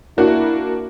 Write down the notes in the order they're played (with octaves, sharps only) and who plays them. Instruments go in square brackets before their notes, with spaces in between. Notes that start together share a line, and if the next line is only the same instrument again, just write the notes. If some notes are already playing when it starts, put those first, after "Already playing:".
[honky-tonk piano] A#3 D4 F#4 [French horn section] E4